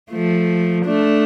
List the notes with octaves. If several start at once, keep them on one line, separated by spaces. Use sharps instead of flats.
F3 A3
A3 D4